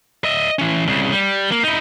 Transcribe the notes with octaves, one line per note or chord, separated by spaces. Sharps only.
D#5 E5
E3 C#4
C2 C#3
G3
A#3
D#4 E4